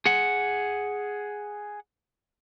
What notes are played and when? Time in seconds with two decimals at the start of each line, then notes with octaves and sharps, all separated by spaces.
0.06 G#4 F#5